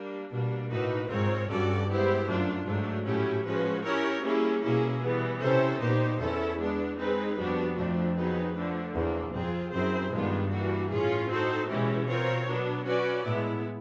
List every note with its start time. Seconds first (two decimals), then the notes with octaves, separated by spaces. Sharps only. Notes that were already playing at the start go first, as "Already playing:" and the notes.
Already playing: G3 A#3 D4
0.31 B2 G3 A#3 D4
0.70 A2 A#3 D#4 F#4 B4
1.10 G#2 C4 F4 A#4 C#5
1.49 G2 C#4 F#4 A4 D5
1.89 G#3 B3 E4 G4 C5
2.27 F#2 F#3 A3 D4 F4
2.66 G#2 F#3 A3 D4
3.06 A2 F#3 A3 C#4 E4 G4
3.45 F3 G#3 C#4 F#4 B4
3.84 C#4 E4 G4 A#4 C#5
4.23 G3 A#3 C#4 E4 G#4
4.62 B2 A#3 C#4 E4 G#4
5.02 E3 G3 B3
5.41 C3 C#4 E4 A4 C5
5.80 A#2 B3 D#4 G4 C5
6.20 E2 C#4 E4 A4
6.59 G#3 B3 D4
6.98 G#3 C4 D#4 G#4 B4
7.37 F2 G3 B3 D4 F#4
7.76 F2 F3 A3 D4
8.15 F#3 B3 D#4 G#4 B4
8.55 D3 F3 A3 D4
8.94 E2 F3 A#3 D4
9.33 F2 C4 F4 G#4
9.72 F#2 C4 E4 G#4 C5
10.11 G2 D#3 G#3 B3 D4 F4
10.51 E3 G3 A#3 D4 F#4
10.89 A2 C#4 F4 G#4
11.29 C4 D#4 F#4 A4 C5
11.68 B2 E3 G#3 C#4 E4 G4
12.07 C4 F4 A#4 C#5
12.47 F#3 B3 D4
12.86 C#4 F#4 B4 D5
13.24 A2 G#3 B3 E4